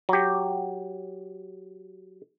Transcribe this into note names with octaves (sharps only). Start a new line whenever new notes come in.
F#3 G4